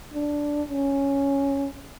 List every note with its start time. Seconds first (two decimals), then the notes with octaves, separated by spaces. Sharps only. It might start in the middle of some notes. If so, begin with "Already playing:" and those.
0.14 D4
0.68 C#4